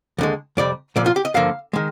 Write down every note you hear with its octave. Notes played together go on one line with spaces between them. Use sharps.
D#2 D3 G#3
F2 C3 G3 D5
C2 A#2 F3 D5
F4
G4
D#5
G2 D3 F3 A#3 F5
D#3 G#3